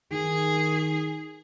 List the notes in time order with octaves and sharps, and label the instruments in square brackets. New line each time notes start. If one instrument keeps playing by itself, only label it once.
[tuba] D#3 [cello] G#4